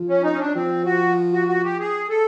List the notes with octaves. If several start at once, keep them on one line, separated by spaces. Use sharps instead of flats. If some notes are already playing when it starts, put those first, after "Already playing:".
Already playing: F3
C#4
D#4
C#4
D4
F3 C4
F#4
F#4
F#4
G4
G#4
A4